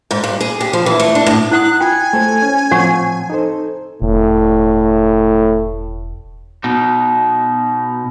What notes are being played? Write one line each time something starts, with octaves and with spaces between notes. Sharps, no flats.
G#2
G2
G#4
G4
F3
E3
A3
D4
A2
E4 F#5 D#6 F#6
F4 G5 G#5
A3 A4 C5
C#4
A2 F3 C4 C#5 F#5 C#6
D#4 A4 C5
E1 A2
B2 D#4